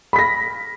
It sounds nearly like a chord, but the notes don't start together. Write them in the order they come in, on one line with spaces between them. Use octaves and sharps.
B5 B6 A#6